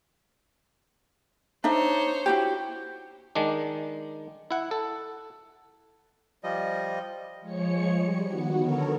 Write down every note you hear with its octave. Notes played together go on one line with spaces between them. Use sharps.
D4 D#4 C5 C#5 E5
E4 F#4 G4
D#3 G#3 D4
E4 F#5
A4
F3 G3 D#5
F3 G#3 C#5 C#7
G3
D#3 B3 F#4
D3 B3 A4 A#4 C#5